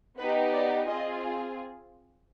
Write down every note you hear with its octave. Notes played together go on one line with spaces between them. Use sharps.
B3 D#4 G4 B4
D5
C4 F4 G#4 D#5